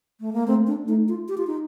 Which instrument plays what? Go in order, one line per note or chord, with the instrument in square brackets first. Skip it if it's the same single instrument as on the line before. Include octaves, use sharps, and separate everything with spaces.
[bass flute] A3
A#3
[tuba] A3 [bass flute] C4
[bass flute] D4
[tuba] A3 [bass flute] D#4
[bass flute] F4
G4
F4
D#4